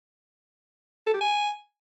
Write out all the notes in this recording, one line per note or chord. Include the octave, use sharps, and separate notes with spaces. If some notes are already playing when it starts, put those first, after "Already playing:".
A4
G4
G#5